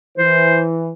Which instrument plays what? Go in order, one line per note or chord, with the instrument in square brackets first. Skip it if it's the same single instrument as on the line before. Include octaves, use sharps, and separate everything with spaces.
[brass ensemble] E3 [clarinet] C5